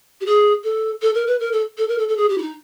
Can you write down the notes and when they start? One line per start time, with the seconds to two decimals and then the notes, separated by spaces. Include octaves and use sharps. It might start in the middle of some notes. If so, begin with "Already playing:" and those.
0.21 G4
0.26 G#4
0.64 A4
1.02 A4
1.14 A#4
1.27 B4
1.40 A#4
1.52 A4
1.78 A4
1.88 A#4
1.98 A4
2.08 A4
2.17 G#4
2.29 G4
2.38 E4
2.42 D#4